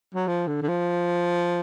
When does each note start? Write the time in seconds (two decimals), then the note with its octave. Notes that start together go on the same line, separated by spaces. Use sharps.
0.15 F#3
0.27 F3
0.47 D3
0.62 D3
0.68 F3